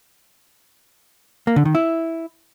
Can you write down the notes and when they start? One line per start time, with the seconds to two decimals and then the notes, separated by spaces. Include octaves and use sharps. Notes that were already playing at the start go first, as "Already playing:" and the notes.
1.47 A#3
1.56 D3
1.65 D#3
1.75 E4